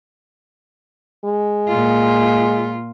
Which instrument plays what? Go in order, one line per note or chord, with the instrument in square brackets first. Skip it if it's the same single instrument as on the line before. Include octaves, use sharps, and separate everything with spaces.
[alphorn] G#3
[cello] A#2 F4